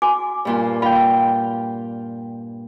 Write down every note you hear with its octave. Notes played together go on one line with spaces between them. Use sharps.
F#4 G#5 D6
G2 A#2 F4
F4 F5 G5 B5